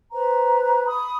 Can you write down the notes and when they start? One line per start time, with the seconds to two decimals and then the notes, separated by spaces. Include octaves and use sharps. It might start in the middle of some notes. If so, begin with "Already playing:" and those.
0.13 B4 C5 A#5
0.84 B5 D#6